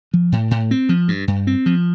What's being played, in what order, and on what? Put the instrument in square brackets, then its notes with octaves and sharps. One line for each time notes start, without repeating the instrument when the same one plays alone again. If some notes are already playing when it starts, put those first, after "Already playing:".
[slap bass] F3
A2
A2
C4
F3
G2
G2
C4
F3